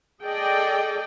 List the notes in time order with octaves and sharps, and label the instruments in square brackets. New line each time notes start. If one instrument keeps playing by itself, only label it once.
[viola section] G#4 A4 D5 D#5 G5